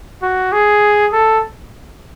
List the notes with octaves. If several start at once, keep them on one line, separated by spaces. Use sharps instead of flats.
F#4
G#4
A4